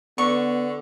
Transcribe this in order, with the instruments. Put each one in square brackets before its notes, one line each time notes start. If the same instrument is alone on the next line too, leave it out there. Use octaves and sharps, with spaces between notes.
[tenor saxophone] D3 [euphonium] B3 [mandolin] C#6